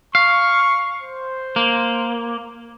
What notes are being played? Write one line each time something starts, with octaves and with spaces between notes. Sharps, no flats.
F5 C#6
C5
A#3